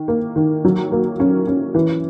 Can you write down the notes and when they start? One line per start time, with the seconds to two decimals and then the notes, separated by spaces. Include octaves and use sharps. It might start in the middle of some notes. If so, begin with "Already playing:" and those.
Already playing: D#3
0.08 A#3
0.36 D#3
0.65 F#3
0.92 A#3
1.20 C#4
1.47 C#4
1.75 E3